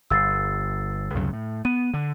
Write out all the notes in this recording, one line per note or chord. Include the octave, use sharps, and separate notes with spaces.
G1 E6 A6 C7
C#2 F#2 C3
A2
B3 D#7
D3